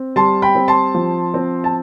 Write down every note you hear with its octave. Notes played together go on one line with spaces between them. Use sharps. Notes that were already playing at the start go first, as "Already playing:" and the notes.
Already playing: C4
G3 A5 C6
G5 B5
C4
A5 C6
F3
C4
A5